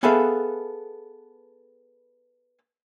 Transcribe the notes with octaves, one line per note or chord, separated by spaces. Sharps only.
B3 G#4 A4 B4 E5 F5